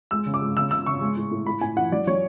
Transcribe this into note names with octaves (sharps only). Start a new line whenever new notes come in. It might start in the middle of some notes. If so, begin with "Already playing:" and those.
G#3 E6
C#3
D6
G#3
C#3 E6
C#3 E6
C#3 C#6
G#3
A2
A2
A2 B5
A2 G#5
E3 F#5
F#3 D5
F#3 C#5